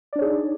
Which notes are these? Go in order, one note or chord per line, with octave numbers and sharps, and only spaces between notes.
D4 D#4 G#4 C#5 D5